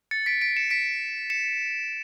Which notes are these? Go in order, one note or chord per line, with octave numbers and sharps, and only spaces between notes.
A6 C#7
B6 D7
B6 D7
C#7 E7
B6 D7
C#7 E7